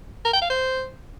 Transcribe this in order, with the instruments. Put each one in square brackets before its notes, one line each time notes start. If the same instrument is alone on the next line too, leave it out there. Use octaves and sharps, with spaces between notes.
[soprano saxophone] A#4
G5
F5
C5